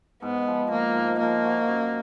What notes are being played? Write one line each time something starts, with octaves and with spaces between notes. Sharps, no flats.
G#2 B3
F3
F3 A#3
G#2
F3 A#3
F#4
F#2